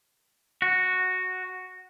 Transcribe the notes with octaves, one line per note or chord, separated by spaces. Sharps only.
F#4